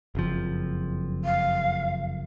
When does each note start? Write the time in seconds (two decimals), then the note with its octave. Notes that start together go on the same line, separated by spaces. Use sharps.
0.15 F#1 F2 F3
1.25 F5